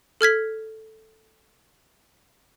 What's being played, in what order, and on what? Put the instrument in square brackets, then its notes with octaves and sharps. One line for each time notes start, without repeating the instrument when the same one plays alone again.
[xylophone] A4 F6 G#6 B6